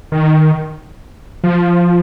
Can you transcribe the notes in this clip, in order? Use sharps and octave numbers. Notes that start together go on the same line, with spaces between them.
D#3
F3